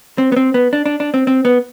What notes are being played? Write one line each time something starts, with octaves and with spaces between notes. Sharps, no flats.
C4
B3
C4
B3
D4
D4
D4
C4
C4
B3